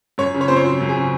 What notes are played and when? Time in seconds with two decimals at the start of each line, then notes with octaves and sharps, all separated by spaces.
0.18 F#2 C#5
0.34 C#3
0.41 C#5
0.48 C4 C5
0.56 C#5
0.65 F#3 C5
0.80 F#2
0.89 G#4
0.96 C#3